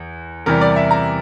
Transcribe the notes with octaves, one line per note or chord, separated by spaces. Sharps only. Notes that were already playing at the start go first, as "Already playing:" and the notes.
Already playing: E2
E2 C3 E3 G3 A#4
D5
E5
A#5